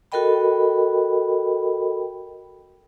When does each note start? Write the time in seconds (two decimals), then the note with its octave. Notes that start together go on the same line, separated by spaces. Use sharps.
0.12 F#4 A4 A#4 D#5 G5 B5